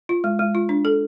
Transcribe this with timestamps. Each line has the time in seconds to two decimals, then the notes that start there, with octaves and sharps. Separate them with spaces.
0.09 F4
0.24 G#3
0.39 G#3
0.55 F4
0.69 D4
0.85 A4